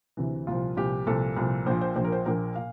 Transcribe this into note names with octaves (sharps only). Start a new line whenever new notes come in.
D2 C3 E3
C2 A#2 F3 F4
C2 A#2 F3 G4
C2 A#2 F3 A4
C2 A#2 F3
A#1 A#2 F3 C5
C5
A#1 A#2 F3 C5
A#4
C5
A#1 A#2 F3 A#4
A#2 F5